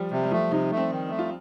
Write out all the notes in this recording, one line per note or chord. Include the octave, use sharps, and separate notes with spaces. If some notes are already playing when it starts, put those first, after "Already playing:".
Already playing: F3 G3
C3 G3
G3
F3 A3
C3 D#4
A3
C4
D#3
A3
F4